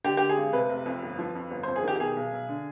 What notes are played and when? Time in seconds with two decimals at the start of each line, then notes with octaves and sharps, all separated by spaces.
0.04 D3 G4
0.17 D3 G4
0.29 G#4
0.36 G#1
0.53 C3 B4
0.69 F1
0.86 F2
1.03 G1
1.19 F3
1.35 F2
1.51 G1
1.63 F2 C5
1.76 G#4
1.83 D#3 G4
1.96 G4
2.00 B2 G#4
2.16 B1
2.33 B1
2.49 D3